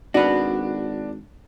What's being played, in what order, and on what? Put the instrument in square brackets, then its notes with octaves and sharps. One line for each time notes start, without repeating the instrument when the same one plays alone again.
[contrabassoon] G#1 [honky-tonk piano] D4 [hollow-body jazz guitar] F#4 B4